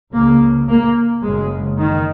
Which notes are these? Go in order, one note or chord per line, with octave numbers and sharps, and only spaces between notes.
C#2 C#3 A#3
A#3
F#1 F#2 C#3 G#3
D#3